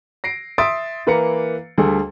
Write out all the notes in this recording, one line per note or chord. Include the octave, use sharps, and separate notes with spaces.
A#6 C7 D7
E5 C6 D#6 A6 D7
E3 A#3 B4 F5 A#5 C#7
D2 G3 G#4 A4